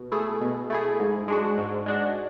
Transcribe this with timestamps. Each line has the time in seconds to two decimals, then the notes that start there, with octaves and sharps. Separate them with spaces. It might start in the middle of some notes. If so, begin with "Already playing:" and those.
Already playing: B2
0.12 A3 E4 G#4
0.41 B2
0.70 A3 E4 G#4
0.99 G#2
1.28 G#3 D4 F#4
1.58 G#2
1.86 G#3 D4 F#4